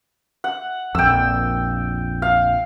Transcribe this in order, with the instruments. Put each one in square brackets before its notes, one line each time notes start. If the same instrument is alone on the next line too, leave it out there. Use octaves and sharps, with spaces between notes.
[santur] F#5
[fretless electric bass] A#1 F2 [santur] G5 E6
[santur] F5